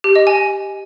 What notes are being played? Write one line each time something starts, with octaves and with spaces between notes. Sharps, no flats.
G4
D#5
G#5